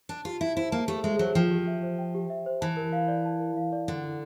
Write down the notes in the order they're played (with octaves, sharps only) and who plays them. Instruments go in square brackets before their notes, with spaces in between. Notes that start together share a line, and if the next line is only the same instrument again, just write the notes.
[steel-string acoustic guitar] D4 [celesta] A5
[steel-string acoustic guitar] F4 [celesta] G4
[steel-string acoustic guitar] E4 [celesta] E5
[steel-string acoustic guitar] E4 [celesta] C5
[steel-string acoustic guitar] A#3 [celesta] A5
[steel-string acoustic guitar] A3 [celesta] G4
[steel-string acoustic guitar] G#3 [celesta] E5
[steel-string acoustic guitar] F#3 [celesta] C5
[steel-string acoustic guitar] F3 [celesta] G5
[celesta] G4
E5
C5
G5
G4
E5
C5
[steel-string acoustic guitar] E3 [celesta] A5
[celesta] A#4
F5
D5
A5
A#4
F5
D5
[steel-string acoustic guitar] D3 [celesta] F#5
[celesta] E4